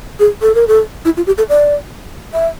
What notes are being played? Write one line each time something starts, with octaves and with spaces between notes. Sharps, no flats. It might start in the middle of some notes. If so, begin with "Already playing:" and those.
G#4
A4
A#4
A4
E4
F4
G4
A4
D5
E5